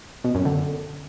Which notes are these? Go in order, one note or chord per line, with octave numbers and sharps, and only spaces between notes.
B2
F#2
D3